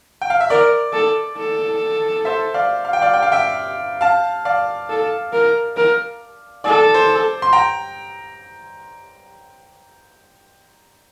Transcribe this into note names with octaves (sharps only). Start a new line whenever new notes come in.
G5
F5
E5
A#4 D5
A4
A4
C5 E5
D5 F5
F5
G5
D5 F5
G5
F5
E5 G5
F5 A5
D5 F5
A4
A#4
A#4
A4 D5
C5
C6
G5 A#5